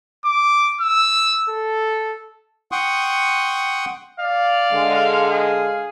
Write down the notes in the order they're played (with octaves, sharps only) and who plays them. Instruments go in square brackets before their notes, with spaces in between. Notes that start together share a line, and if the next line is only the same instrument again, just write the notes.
[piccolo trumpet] D6
E6
A4
[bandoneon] F#5 G5 C6 C#6 D#6
[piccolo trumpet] D5 [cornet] F5
[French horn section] D3 G#3
[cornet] G#4 [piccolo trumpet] F5